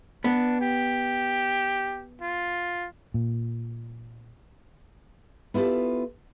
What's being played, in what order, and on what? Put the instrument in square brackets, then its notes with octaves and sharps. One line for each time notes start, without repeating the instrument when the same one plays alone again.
[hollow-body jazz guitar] B3 [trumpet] D4
[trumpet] G4
F4
[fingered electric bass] A#2
[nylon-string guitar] B3 E4 F4 G4 A4